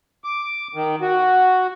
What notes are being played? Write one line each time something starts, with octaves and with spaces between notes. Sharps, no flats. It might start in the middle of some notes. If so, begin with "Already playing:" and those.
D6
D#3
F#4